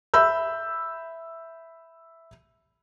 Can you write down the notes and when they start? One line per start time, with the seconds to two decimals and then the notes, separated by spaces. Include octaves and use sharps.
0.14 E5 B5 E6 G6